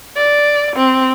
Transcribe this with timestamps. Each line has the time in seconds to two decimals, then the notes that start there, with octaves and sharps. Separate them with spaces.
0.16 D5
0.76 C4